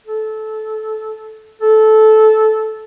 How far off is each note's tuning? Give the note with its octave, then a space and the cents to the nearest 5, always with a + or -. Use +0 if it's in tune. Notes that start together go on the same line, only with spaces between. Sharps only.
A4 -20
A4 -15